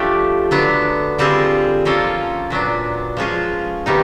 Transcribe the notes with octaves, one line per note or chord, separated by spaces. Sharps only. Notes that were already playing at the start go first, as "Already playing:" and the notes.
Already playing: F3 A3 D4 G4
D3 F#3 B3 D4
D3 G3 C4 F4 G#4
F3 A#3 C#4 F4 A4
A#2 F#3 B3 D4
F3 G#3 C#4 F4 G#4
C3 D#3 G3 B3 D#4